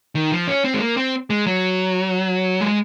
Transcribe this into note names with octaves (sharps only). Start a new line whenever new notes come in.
D#3
F3
C#4
C4
G#3
A#3
C4
G#3
F#3
G#3